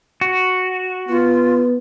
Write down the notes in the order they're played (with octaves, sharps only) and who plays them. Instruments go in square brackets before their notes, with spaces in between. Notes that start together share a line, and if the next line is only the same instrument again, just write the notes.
[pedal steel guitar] F#4
[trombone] B3 [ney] F4